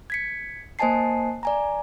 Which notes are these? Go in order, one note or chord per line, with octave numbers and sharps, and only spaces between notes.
G#6 B6 C#7
A#3 C5 D#5 G#5 A5 C7
D5 G#5 A#5